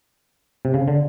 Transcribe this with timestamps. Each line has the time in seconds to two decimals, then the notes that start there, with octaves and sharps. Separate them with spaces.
0.65 C3
0.74 C#3
0.88 D3